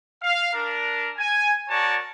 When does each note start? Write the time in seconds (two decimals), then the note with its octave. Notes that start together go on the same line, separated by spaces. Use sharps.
0.23 F5
0.54 D4 A#4
1.18 G#5
1.69 F#4 A#4 C#5 D5 A5